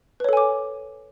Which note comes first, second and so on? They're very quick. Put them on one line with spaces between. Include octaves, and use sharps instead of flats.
B4 C#5 A4 G#5 D6